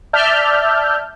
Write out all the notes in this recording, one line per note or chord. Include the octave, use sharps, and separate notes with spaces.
D5 E5 A5 F6 G6